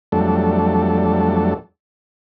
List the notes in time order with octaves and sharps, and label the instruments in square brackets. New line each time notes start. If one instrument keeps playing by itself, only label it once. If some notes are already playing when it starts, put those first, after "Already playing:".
[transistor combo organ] F2 F#3 G3 A3 D4 A4